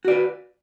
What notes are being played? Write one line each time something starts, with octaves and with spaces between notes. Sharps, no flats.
F#4 B4 D5